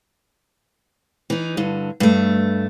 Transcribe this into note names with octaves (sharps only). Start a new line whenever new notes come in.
E3 D#4
G2 D3
G2 A3